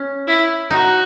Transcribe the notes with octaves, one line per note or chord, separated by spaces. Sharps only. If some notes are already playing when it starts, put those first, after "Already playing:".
Already playing: C#4
E4
D#4 F#4